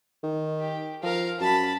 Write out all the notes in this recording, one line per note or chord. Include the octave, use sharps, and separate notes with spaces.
D#3
G4
F3 A#4 F5
F#2 A5 B5